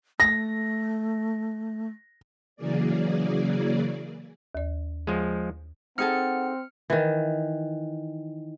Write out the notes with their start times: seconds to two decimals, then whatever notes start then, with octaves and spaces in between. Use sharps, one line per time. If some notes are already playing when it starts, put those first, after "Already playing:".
0.20 A3 A#6
2.56 C#3 E3 F#3 A#3 G#4 D5
4.55 D#2 D5
5.07 F3 G#3
5.98 C4 D#4 G#4 A4 F#5 F6 C#7
6.90 D#3 E3